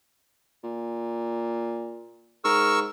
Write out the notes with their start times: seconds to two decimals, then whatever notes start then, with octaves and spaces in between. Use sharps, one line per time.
0.64 A#2
2.44 G#2 A#4 C#6 E6